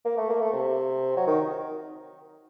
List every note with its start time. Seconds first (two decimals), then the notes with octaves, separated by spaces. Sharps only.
0.05 A#3
0.17 A3
0.29 A#3
0.41 A3
0.53 C3
1.17 F#3
1.27 D#3